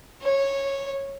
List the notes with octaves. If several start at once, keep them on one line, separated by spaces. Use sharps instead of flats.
C#5